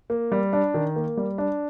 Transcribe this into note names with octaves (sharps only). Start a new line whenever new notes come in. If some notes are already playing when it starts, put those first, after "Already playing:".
A#3
G3
D4
D#3
A#3
G3
D4